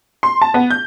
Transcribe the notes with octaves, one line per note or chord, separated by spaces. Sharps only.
C6
A5
B3
G6